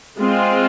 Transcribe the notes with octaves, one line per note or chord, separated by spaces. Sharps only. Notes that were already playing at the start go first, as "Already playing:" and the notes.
G#3 C4 F4